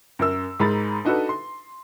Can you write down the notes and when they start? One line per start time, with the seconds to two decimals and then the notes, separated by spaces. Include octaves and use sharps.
0.19 F#2 A#4 E6
0.60 G#2 G#3 A#4 A#5 B5 A6
1.05 D4 D#4 F#4 A4 B4
1.29 C6